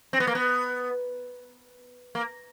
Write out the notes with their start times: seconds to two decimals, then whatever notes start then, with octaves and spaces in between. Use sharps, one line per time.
0.13 C4
0.20 B3
0.27 A#3
0.35 B3
2.15 A#3